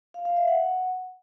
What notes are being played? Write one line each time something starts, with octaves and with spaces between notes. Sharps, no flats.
F5
F5
E5
F#5